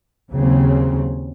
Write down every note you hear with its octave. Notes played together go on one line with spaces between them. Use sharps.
D#2 C#3 F#3 C4